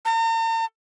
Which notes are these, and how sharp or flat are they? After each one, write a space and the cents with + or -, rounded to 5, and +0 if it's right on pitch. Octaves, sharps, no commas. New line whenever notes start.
A#5 -45